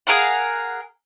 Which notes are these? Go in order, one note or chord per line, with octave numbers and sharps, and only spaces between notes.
G#4 A#4 F5 F#5